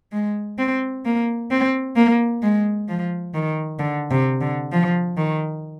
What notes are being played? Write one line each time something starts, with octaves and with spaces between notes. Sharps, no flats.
G#3
C4
A#3
C4
A#3
G#3
F3
D#3
D3
C3
D3
F3
D#3